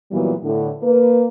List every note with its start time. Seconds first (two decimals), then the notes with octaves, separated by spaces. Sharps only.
0.12 A#2 E3 F#3 G3 B3
0.43 A2 D3
0.83 A#3 B4